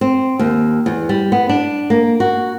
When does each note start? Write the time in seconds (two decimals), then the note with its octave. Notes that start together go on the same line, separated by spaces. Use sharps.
0.01 C4
0.39 D#2
0.86 E2
1.09 G3
1.32 B3
1.49 D4
1.90 A#3
2.20 F#4